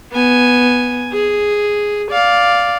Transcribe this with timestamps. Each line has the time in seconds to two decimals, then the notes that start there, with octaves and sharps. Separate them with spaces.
0.13 B3 G#5
1.12 G#4
2.11 D5 F5